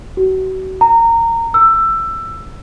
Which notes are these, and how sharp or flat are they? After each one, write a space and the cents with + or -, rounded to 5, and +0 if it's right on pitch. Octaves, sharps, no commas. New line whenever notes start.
F#4 +35
A#5 -20
E6 +15